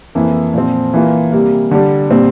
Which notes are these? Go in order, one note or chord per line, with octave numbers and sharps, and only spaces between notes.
F2 E3 A#3
A#2 F3 C4
E3 A#3 F4
C3 G3 A#3
D3 G3 D4
A#2 G3 C4